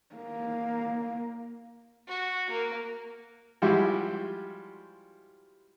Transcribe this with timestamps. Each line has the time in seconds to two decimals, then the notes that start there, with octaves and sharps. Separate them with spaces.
0.16 A#3
2.07 F#4
2.50 A#3
3.62 F3 G3 G#3 E4 F#4 G4